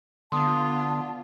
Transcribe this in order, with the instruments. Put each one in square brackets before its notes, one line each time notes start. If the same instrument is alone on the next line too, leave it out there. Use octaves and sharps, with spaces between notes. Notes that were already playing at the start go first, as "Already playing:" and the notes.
[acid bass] D3 [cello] B3 F4 [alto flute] A5 [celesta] C6 D#6